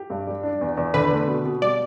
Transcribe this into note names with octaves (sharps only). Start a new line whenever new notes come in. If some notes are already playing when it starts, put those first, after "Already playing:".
Already playing: G4
G2
G3
D4
E2
E2
D3 B4
A3
B2
B2
G3 D5